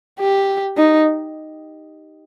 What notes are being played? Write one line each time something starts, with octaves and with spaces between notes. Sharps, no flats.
G4
D#4